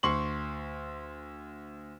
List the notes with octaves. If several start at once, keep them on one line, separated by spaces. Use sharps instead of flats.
D2 C6 C#6 F#7